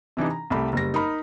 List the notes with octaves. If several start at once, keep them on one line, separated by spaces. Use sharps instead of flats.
C3 E3 D4 D#4
A#5
C2 A3 G4 B5
F#1 G3 A#6
D#4 A#4 B5